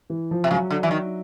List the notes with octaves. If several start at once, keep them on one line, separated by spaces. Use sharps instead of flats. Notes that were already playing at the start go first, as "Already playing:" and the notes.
E3
F3
C3
C#3 F#3
D3
E3
D#3